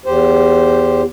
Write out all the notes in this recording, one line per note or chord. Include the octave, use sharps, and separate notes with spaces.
E2 G4 C5